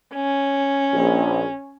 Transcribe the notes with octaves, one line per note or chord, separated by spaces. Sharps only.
C#4
A#1